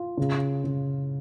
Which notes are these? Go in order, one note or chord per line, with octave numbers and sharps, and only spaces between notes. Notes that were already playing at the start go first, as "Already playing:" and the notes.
Already playing: F4
C#3
C#3